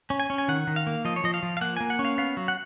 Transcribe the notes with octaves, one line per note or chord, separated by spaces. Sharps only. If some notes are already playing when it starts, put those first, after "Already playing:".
C#4
G#5
C#4
G#5
D#3 F#5
D#3
F5
A#3
F3 D#5
C#5
F3 D#5
F5
F3
F5
A#3 F#5
A#3 G#5
F#5
C#4
F5
B3 F5
F#3
F#5